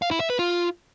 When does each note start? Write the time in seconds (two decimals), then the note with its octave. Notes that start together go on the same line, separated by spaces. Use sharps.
0.02 F5
0.11 E4
0.20 E5
0.30 B4
0.39 F4